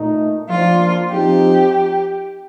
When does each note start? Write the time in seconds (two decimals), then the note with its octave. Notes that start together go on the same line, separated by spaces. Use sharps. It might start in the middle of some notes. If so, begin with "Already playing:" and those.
Already playing: A#2 A3 D#4
0.49 F3 A#3 D4 F4
1.11 F3 C4 D#4 G4